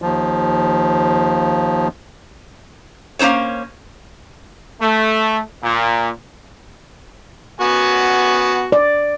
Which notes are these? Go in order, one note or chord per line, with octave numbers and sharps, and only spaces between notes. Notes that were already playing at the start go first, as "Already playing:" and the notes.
D#2 F3
A#3 C#4 D#4 C5 C#5
A3
A#2
B3 F#4 G#5
D5